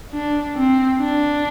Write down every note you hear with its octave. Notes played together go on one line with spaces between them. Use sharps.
D4
C4
D4